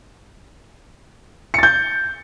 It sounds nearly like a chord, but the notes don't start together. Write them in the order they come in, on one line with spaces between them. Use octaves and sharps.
C#7 A6 G6